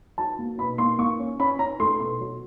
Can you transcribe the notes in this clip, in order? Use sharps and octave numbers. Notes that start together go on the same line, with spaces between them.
F#3 A5
A#3
B2 B5
A#3 C6
A#3 C#6
C#4
C#4 B5
C#4 A#5
A3 C6
B2 C6
F#3